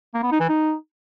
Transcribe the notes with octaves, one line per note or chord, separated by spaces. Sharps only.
A#3
B3
D#4
E3
D#4